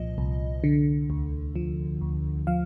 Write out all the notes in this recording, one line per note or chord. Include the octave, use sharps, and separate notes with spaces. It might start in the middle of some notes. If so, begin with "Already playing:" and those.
Already playing: C2 A#2 F3 D#5
C2
D3
D2
F3
D2
F3 F5